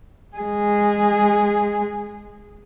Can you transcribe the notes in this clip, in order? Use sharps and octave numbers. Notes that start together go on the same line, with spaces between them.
G#3 G#4